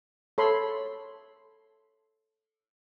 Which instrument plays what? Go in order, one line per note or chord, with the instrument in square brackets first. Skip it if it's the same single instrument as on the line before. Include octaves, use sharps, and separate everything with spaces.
[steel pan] A4 C#5 B5 C6